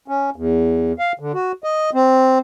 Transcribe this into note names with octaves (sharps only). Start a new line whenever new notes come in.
C#4
E2
F5
D3
F#4
D#5
C4